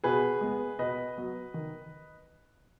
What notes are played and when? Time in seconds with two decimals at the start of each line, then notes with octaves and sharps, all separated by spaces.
0.04 B2 G#4 B4
0.41 G#3 B3
0.79 B2 B4 D#5
1.17 F#3 B3
1.54 D#3